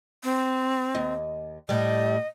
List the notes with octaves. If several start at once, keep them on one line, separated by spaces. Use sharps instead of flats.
C4
D#2 D#5
A2 G3 D#5